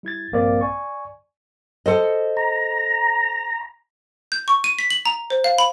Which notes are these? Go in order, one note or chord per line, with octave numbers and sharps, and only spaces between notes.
G3 E4 G#6 A6
A#1 G2 A#3 C4 D5 A6
D5 G#5 C#6
A4 C5 D#5
A#5
G6
C#6
D#7
B6
F#7
A#5
C5
F5
B5